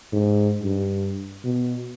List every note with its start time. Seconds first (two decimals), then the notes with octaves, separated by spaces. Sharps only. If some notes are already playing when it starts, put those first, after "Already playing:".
0.12 G#2
0.63 G2
1.44 B2